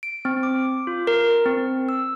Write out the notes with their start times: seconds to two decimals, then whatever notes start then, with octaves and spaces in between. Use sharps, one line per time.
0.03 D7
0.25 C4
0.43 D6
0.87 F4
1.07 A#4
1.46 C4
1.89 E6